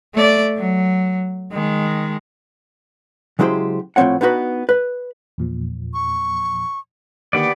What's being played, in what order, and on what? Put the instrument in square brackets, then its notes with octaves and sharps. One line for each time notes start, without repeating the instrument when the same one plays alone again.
[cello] A3 D5
F#3
D#3 G#3
[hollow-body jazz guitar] C#3 F#3 G#3 E4 G4 C5
A2 F3 F#3 C4 C#5 F#5
B3 D4 D#4 F#4 B4
B4
[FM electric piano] E2 A#2 F3
[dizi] C#6
[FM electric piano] D3 D#3 A#3 [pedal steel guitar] B3 D5 [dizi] G4